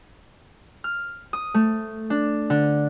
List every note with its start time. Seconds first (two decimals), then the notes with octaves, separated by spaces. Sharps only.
0.84 F6
1.33 D#6
1.54 A3
2.10 D4
2.50 D3